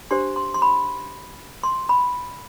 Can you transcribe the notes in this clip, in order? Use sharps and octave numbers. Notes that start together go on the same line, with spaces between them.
D4 G4 C5 C6
C6
C6
B5
C6
B5